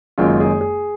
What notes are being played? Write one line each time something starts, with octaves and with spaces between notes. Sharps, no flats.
F#1 F#2 D#3 G#3 F4
G#4
G#4